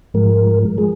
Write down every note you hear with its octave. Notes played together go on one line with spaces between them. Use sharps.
G#2 F3 G#3 A#4
F3 G#3 G#4